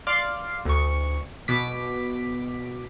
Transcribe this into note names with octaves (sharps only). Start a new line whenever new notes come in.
D5 F5 C6
D2 C#6
B2 D6 B6